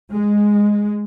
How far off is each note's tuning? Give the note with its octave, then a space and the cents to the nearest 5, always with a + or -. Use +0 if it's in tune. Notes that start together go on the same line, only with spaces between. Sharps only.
G#3 -5